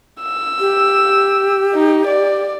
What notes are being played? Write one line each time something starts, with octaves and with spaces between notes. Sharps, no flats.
E6
G4
D#4
D5